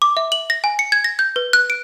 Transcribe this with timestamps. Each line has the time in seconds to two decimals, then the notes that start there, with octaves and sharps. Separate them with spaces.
0.02 D6
0.17 E5
0.32 F#7
0.50 A#6
0.64 G#5
0.79 C#7
0.92 G#6
1.04 A#6
1.19 G6
1.36 B4
1.53 F#6
1.70 D7